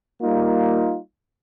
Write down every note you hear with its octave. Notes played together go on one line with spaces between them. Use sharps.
G3 A#3 D#4 F4